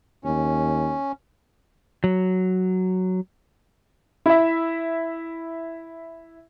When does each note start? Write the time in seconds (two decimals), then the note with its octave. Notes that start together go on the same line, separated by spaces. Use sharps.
0.24 D#2 C#4
2.04 F#3
4.26 E4 E5